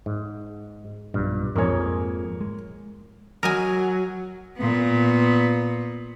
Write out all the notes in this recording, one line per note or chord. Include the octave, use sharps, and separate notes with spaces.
G#2
B1 G2 A#2
F2 G#2 A#3 G#4 C#5
G#3
F#3 A#4 D#5 G#5
A#2 B3